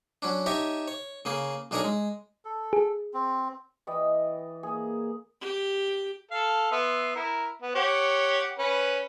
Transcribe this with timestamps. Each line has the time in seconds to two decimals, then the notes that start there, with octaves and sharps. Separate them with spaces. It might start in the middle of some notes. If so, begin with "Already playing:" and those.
0.22 F#3 C#4 D4
0.46 D#4 G4 C#5 D#5 E5 A5
0.88 C#5
1.25 C#3 A#3 G#4
1.71 B1 D4 G#4 A#4 C#5 D#6
1.84 G#3
2.45 A4
2.73 G#4
3.14 C4
3.87 E3 D5 D#5 G5
4.63 A#3 G#4
5.41 G4
6.31 A4 F5
6.72 B3 E5 C6
7.16 E4 A#4
7.62 B3
7.75 G4 C#5 F#5
8.58 C#4 B4